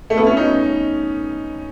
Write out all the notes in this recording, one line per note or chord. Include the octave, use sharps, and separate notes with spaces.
A3
B3
C#4
D#4